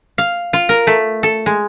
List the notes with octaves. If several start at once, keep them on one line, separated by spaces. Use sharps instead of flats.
F5
F4
A#4
A3
A4
G#3